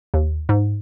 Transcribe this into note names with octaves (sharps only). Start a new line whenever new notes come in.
D#2
G#2